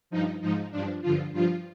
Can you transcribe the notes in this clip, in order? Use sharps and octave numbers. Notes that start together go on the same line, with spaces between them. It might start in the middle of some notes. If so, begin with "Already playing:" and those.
G2 F3 D#4
G#2 F3 D#4
G2 F3 D4
G2 D3 F3 F4
G2 F3 F4